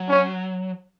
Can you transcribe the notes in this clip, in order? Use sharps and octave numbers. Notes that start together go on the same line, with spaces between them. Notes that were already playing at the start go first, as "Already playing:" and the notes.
Already playing: F#3
C#4